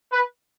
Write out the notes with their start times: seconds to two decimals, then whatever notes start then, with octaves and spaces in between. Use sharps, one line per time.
0.12 B4